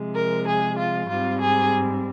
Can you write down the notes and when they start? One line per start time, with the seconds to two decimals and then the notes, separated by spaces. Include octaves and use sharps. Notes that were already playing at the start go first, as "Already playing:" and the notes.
Already playing: C3 F3 G#3
0.15 A#4
0.46 G#4
0.78 F4
1.09 G#2 G3 C4 F4
1.40 G#4